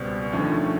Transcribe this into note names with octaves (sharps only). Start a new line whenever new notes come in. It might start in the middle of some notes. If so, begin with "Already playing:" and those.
Already playing: C#2 B2 G3 C4
D#2 D3 F3 A3 C#4